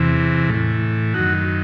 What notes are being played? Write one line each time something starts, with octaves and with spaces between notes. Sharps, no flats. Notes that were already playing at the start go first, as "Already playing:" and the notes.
Already playing: E2 C3 E3
A2 E3
F#2 D#3 F#4